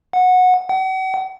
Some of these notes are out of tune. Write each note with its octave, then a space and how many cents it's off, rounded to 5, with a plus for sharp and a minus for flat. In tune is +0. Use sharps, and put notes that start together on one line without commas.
F#5 -15
F#5 +40